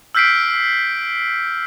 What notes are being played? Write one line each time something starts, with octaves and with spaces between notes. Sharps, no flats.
E6 F6 G6 B6 C7 D7